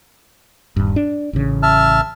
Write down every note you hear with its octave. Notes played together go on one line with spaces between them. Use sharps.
D#1 G2
D4
A1 C#3
E5 A5 F6